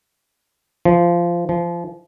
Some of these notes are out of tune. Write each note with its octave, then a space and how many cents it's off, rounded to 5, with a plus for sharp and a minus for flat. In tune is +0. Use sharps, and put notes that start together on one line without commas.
F3 -15
F3 -25